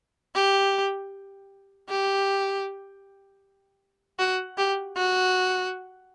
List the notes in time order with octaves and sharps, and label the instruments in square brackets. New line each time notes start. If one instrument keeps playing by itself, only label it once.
[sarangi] G4
G4
F#4
G4
F#4